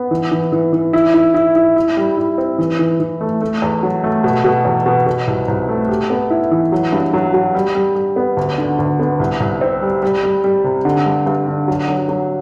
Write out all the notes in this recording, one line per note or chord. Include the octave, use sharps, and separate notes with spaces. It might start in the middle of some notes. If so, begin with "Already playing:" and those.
Already playing: B3
E3
E3
E3
E3
E4
E4
E4
E4
E4
G3
E4
C4
E3
E3
E3
A3
A3
E2
F#3
A3
B2
B2
E2
B2
B2
C2
C2
A3
G4
B3
E4
E3
F#3
G2
F#3
F#3
G3
G3
G3
B3
D2
D3
D2
B3
C2
C2
C4
G3
G3
G3
G3
C3
D3
G2
G2
D3
F#3
F#3
F#3